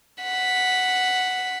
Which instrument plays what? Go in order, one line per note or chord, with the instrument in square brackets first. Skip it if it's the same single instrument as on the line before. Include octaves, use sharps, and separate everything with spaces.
[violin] F#5 B6